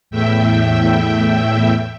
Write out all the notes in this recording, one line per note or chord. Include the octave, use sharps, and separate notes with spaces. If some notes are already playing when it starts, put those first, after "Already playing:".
E2 A2 E5 G5